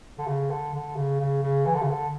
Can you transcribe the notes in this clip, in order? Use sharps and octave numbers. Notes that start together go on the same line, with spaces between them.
D3
C#3
D3
D3
C#3
C#3
C#3
E3
D3
C#3
D3